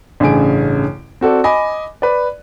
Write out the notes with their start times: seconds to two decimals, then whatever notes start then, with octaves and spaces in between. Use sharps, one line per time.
0.20 A1 G2 C#3 G#5 D7
1.21 C4 F#4 A4 D5
1.44 D#5 G#5 B5 D6 D#6
2.02 B4 D5